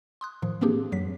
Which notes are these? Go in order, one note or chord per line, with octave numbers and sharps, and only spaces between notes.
C6 D#6 F#6
A2 D#3 F3
E3 A#3 C4 D4 G4 G#4
F#2 F#3 B6